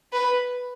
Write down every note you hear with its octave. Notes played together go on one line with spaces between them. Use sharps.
B4